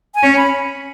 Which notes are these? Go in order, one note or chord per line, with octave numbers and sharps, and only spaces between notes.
G#5
C#4
B5